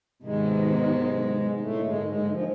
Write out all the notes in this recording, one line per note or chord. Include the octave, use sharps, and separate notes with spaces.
G#2 C3 D#3 F#3 G#3 B3
A2 D3 F#3 A3 A#3
G#2 G#3
G#2 G#3
F3